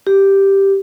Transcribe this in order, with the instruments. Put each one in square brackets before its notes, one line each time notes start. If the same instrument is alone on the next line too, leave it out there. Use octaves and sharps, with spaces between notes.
[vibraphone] G4